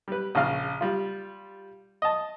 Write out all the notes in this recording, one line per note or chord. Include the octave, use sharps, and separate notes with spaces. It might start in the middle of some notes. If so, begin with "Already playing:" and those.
G3 B4
A#1 C#3 F5
G3 F4
D#5 A5